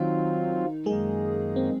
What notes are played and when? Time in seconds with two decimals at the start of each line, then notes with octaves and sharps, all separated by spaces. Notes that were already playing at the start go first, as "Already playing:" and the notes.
Already playing: D#3 F#3 C4 D#4 F4
0.85 F#2 D#3 G#3 A#3 D#4 G#4
1.56 C4